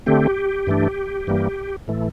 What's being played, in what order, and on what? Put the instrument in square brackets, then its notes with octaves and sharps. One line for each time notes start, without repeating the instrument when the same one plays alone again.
[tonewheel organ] D3 A3 C4 G4
G2 E3 A3 D4
G2 E3 G3 A#3
A2 E3 A3